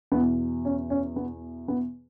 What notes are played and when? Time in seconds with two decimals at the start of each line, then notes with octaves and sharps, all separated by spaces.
0.12 E2 B2 B3
0.65 C#4
0.90 C#4
1.16 B3
1.68 B3